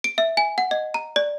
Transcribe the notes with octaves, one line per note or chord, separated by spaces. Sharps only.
D7
E5
G#5
F#5
D#5
A#5
D5